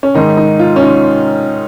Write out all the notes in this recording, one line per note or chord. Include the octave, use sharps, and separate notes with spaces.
C#4
G#2 D#3 D#4
D#4
F4
C#4
D#4